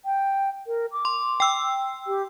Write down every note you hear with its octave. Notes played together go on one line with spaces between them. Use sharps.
G5
A#4
D6
C6
G5 E6
G4